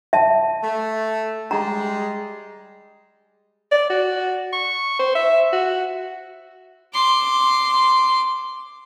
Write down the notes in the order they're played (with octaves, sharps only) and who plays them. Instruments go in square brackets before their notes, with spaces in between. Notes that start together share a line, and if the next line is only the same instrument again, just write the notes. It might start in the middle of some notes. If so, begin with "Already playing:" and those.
[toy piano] E5 A5
[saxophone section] A3
[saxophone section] G3 G#3 [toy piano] A#5
[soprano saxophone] D5
F#4
C#6
C5
E5
F#4
[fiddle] C6 D6